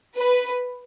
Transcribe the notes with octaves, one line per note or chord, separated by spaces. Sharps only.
B4